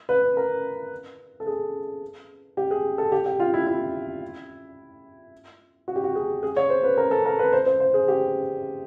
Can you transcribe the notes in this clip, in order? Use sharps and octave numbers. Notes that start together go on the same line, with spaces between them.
B4
A#4
A4
G#4
G4
G#4
A4
G4
G4
F4
E4
E4
F#4
G4
F#4
G#4
G#4
C#5
C5
B4
A#4
A4
A#4
B4
C5
C5
C5
G#4
G4